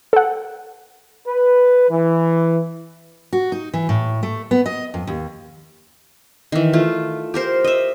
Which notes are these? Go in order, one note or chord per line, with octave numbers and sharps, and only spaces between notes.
A4 F#5
B4
E3
F#4
D#4
E3
A2
A3
B3
D#5
F2
D#2
D#3 E3
A3 F4
G4 A#4 C5
D#5 E5